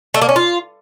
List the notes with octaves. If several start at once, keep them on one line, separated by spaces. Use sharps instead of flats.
A3
A#3
C#4
F4